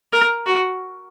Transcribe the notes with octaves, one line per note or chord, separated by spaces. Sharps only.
A#4
F#4